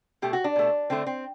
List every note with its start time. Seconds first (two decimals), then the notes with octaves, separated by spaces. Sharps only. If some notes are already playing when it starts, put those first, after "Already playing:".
0.22 B2 A3 G4
0.33 F#4
0.44 D4
0.56 B2 A3
0.90 D3 A3 C4
1.07 C4